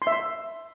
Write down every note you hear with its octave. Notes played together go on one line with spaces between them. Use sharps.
C6
E5
C6